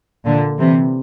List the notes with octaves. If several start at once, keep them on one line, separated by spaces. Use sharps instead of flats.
A#2 D3
C3 E3